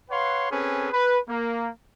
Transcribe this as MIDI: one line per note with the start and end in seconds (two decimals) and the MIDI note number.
0.10 0.50 71
0.10 0.50 73
0.10 0.50 77
0.10 0.50 78
0.10 0.50 84
0.51 0.89 60
0.51 0.89 61
0.51 0.89 68
0.51 0.89 69
0.51 0.89 71
0.92 1.18 71
1.29 1.68 58